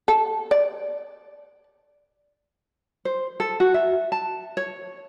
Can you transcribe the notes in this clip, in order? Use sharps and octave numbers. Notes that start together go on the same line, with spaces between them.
A4
D5
C5
A4
F#4
E5
A5
C#5